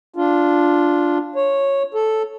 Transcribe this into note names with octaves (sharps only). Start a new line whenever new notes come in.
D4 F4
C#5
A4